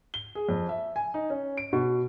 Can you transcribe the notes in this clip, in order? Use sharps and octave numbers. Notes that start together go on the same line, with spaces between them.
G7
G#4
F2
E5
G#5
D#4
C#4
D7
B2